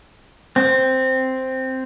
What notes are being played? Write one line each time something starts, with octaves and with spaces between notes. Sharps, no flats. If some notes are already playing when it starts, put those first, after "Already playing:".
C4